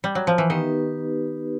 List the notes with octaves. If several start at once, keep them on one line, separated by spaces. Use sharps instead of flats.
G3
F#3
F3
E3
D#3 B3 D#4 G4 B4